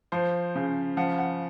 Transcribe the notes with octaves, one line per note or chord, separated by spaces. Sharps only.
F3 C5
C#3
F3 F#5
F#5